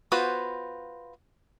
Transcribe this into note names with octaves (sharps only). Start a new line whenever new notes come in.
B3 F4 F#4 B4 C5